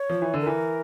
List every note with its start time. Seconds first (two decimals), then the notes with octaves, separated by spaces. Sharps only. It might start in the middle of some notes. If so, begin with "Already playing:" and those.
Already playing: C#5
0.09 F3
0.22 E3
0.34 D3
0.40 A#4
0.47 E3